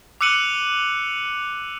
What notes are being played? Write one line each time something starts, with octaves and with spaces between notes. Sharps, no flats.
D6 E6 F#6 C#7 D#7 F#7